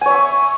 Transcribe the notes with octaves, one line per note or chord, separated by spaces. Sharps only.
C#5 E5 G#5 C#6